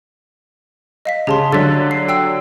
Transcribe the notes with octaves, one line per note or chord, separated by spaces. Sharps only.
D#5 F5 B6
C#3 G4 A5 C6
D3 F#3 A6 B6
C7
G5 E6 C7